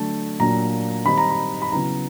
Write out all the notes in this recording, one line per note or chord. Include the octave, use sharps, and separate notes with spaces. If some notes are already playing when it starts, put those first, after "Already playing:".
Already playing: D3 F#3 A3 D4 A5
A#2 F#3 A#3 D4 A#5
D#3 G3 C4 D#4 B5
A#5
B5
B5
C#3 F#3 B3 E4 A#5